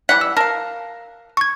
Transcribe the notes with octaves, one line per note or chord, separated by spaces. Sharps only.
E3 G3 F#5 B6
E6
A#4 F5 A5
C#6 G#6